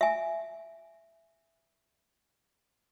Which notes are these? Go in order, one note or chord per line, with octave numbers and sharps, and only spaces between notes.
E5 G#5